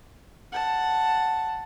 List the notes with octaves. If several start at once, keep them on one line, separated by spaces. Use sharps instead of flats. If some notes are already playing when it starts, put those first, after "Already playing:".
F#5 A5